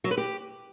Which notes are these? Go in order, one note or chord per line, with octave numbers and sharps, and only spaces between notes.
F#3
B4
G4